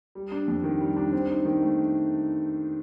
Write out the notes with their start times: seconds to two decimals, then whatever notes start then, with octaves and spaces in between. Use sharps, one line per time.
0.15 G3
0.32 D4
0.48 F2
0.64 D#3
0.81 G3
0.96 D4
1.13 C4
1.29 D#4
1.45 D#3
1.62 A3